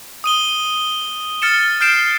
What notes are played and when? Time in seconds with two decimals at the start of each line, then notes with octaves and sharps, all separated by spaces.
0.24 D#6 D#7 G7
1.42 F6 A6 C#7 E7
1.81 F6 G6 C7 D7 E7